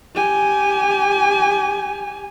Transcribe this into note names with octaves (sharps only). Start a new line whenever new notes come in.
G4 G#5